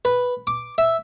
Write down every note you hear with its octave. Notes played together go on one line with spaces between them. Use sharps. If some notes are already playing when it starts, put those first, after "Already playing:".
B4
D6
E5